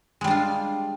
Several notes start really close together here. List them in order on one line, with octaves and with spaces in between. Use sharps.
G#3 G3 D4 F4